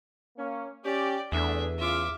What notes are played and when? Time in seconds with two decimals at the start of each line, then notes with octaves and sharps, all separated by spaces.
0.37 A#3 C#4
0.85 C#4 G4 D5
1.32 E2 A3 D4 G#4 E5
1.79 C#3 F4 E5 D6